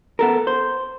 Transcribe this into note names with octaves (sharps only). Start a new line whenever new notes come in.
B3 A4 A#4
C5